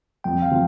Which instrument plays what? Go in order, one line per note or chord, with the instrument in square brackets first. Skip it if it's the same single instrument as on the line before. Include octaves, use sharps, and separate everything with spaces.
[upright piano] F2 [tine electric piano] G5
[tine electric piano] F5
[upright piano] F3